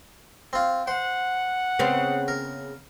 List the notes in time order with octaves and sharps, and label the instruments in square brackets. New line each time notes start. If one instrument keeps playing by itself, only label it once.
[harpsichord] C4 F4
[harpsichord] C5 [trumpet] F#5
[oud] C#3 B3 C4
[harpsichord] A#4